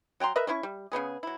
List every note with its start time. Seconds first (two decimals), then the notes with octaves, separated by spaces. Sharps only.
0.20 F#3 G5 A#5 C6
0.36 A#4 B4 D#5 E5
0.47 A3 C#4 E4 C#6
0.63 G3
0.92 C#3 G3 B3 G#4
1.23 F#3 E4